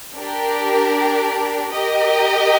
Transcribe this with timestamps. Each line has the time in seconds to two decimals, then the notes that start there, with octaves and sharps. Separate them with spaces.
0.16 D4 G4 A#4
1.69 G4 A#4 D#5